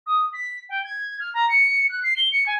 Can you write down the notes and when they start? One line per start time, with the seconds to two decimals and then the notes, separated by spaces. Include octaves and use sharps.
0.06 D#6
0.33 B6
0.69 G5
0.84 G#6
1.20 F6
1.34 A#5
1.49 C#7
1.89 F#6
2.03 C7
2.16 G7
2.32 C#7
2.46 G#5